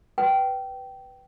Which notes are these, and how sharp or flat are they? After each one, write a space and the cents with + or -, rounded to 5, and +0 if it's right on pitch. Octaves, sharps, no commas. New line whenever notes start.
B4 +0 G5 -15